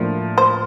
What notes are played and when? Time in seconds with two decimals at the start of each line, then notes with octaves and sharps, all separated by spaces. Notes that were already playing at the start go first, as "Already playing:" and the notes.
Already playing: A2 F3 A#3 D4 F4
0.38 C5